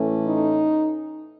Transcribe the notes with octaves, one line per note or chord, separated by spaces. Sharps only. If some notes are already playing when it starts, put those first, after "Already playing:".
Already playing: A2 E3 A3 C#4
D#4